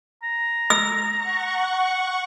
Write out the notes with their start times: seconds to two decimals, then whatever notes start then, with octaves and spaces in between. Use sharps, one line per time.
0.23 A#5
0.70 E6
1.17 F#5 C#6